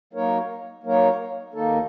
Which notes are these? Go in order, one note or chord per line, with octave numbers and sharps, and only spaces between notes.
F#3 A#3 D#4 A#4 C#5
F#3 A#3 D#4 A#4 C#5
D#2 D#3 A#3 D#4 A4